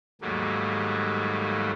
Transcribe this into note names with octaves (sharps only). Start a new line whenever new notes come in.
D#2 G#2 F#3 G3 A3 A#3